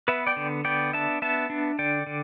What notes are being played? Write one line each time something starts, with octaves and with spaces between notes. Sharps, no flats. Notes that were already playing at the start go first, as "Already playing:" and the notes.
B3 B4 E5
D5 G5
D3
B3 D5 G5
D4 E5 A5
B3 E5 A5
D4
D3 D5 G5
D3